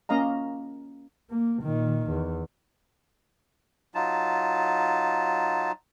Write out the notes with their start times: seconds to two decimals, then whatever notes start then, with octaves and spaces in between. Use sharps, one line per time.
0.09 A#3 C#4 D#5 F5 A#5
1.30 A#3
1.63 A#2 D#3
2.11 E2
3.95 F#3 D#4 F4 A5